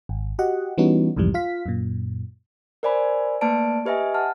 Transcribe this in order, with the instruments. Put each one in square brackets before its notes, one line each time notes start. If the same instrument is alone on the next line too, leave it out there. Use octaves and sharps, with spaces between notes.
[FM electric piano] G#1
F#4 G4 D#5 F#5
E3 G3 B3 C#4 D#4 F#4
C2 F2 G#2 E3 G3
F4 F5 B6
F#2 A#2
[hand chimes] A#4 C5 D5 G#5 B5
A3 A#3 B4 D5 A5 D7
G4 B4 D#5 E5 G#5
F#5 A5 F6